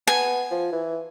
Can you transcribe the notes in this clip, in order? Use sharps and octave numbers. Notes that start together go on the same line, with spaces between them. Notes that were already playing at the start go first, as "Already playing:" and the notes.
B3 G#5
F3
E3